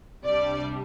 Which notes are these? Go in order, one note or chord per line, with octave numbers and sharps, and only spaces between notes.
C2 C3 G3 D4 D5